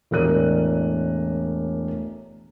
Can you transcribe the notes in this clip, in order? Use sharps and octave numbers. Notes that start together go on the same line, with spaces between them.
E1 A2 A#4 D5 F#6 D#7